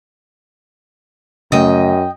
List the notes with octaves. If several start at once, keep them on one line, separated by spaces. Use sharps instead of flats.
F#2 C#3 A3 D#5 G5